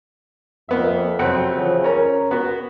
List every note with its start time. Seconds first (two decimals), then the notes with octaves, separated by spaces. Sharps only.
0.69 F2 A#3 B3 E5
1.19 F2 C3 F#3 C4 F#5
1.54 C#3 E3 F3
1.84 C#4 A#4 A#5
2.31 B3 F#4